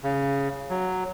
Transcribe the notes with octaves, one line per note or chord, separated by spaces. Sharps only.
C#3
F#3